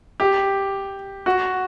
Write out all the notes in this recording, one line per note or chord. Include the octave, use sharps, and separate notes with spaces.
G4
F#4